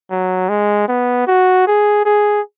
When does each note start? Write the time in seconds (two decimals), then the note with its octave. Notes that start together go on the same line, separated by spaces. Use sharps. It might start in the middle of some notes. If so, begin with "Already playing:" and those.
0.11 F#3
0.49 G#3
0.88 B3
1.27 F#4
1.67 G#4
2.06 G#4